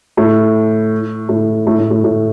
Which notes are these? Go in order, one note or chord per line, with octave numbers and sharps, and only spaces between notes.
A2
A2
A2
A2
A2
A2